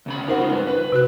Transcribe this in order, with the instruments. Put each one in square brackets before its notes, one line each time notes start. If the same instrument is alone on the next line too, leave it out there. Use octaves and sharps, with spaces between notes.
[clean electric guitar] D2 C#3 B5
[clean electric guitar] C#4 A#4 [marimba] D#4 C5 F#5
[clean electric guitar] C#4 F4
C#2 G2 B4
B4
[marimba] C3 F#4 F#6